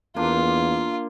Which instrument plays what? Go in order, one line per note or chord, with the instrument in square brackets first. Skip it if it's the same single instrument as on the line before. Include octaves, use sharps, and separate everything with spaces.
[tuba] E2 [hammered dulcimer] A#3 D4 [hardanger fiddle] F4